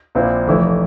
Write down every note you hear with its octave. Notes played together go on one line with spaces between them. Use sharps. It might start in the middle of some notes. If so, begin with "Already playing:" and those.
A#1 A#2 F3 C4 E4
F1 F2 E3 A3 E4